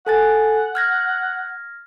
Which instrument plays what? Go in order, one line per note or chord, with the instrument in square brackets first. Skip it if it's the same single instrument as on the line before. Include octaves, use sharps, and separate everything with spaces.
[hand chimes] A4 G#5 A6 [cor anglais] F#5
[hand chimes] F6 G#6 A#6